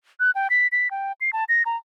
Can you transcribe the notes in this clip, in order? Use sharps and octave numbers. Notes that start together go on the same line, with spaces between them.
F#6
G5
B6
B6
G5
C7
A5
A#6
A#5